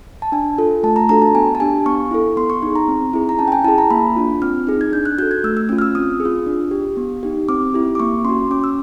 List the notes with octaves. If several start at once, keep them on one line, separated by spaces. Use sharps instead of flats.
A5
D4 G#5
F4 A4
A3 A5
A#5
D4 F#4 A4 A#5
A5
B3 G#5
A5
D4 G4 G#5
B3 C#6
E4 A4
B3 C6
C#6
D#4 G#4
A#5
C4
E4 G#4
A#5
C#4 A5
G5
G#5
E4 G#4 A5
A#5
A#3 B5
D4 F4
C4 F6
D#4 G#4
G#6
D4 G6
F#6
F#4 A4 G6
G#6
A3 E6
E6
C#4 F4 E6
F6
E6
C4 D#6
G#4
F4
D4
G4
B3
D#4 G4
C4 D6
E4 G4
D6
A#3 C#6
C#4 F#4 C6
C#4 D6
E6